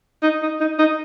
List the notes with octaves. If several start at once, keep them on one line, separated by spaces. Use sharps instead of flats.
D#4
D#4
D#4
D#4